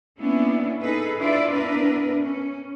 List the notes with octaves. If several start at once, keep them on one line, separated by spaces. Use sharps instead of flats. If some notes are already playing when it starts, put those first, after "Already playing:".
A#3 B3 C#4 D4 E4
D#4 G#4 A4 B4
D4 E4 F4 B4 D5
B3 D4 E4 A#4 B4
C#4